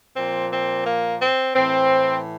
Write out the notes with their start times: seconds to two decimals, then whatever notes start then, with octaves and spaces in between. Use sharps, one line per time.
0.15 A#2 F3 C4
0.51 C4
0.85 A#3
1.20 C4
1.54 A2 E3 C4